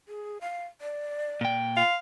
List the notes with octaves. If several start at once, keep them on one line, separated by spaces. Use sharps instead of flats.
G#4
F5
D5
A#2 G5
F5 C6